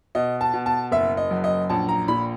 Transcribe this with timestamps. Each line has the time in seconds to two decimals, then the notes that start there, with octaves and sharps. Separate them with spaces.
0.15 B2 D#5
0.41 A5
0.54 B2
0.66 A5
0.92 F#1 E5
1.17 D#5
1.31 F#2
1.44 D#5
1.70 A#1 A5
1.89 A#5
2.08 A#2 B5